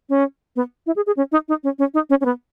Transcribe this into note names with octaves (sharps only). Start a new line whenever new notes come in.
C#4
B3
E4
G#4
G#4
C#4
D#4
D#4
C#4
C#4
D#4
C#4
C#4
B3